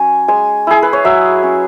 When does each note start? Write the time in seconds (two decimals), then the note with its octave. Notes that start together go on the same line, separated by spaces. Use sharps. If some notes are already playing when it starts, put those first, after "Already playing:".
Already playing: F#3 C#4 G#5
0.28 G#3 G#5
0.67 E4 G#4
0.82 B4
0.93 C#5
1.05 F#3 E5
1.43 C#4